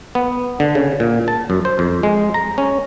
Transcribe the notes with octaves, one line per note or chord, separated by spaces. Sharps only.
B3
D3
C#3
A#2
A5
F#2
C5
F2
G#3
A#5
C#4